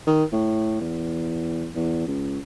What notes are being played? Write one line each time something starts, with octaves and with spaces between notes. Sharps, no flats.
D#3
A2
E2
E2
C#2